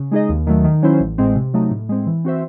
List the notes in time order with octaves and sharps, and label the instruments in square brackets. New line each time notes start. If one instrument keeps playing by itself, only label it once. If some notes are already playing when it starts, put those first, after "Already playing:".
Already playing: [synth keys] C#3
G#3 D#4 G#4 D#5
D#2
D#3 F#3 A3
D#3
F#3 C#4 E4 C5
A1
A2 G#3 C4
C3
F#3 A3 D#4
A2
G#3 C4
E3
C4 F#4 C5 E5